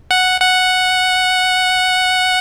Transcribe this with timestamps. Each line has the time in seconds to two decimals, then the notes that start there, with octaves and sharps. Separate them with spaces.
0.11 F#5
0.41 F#5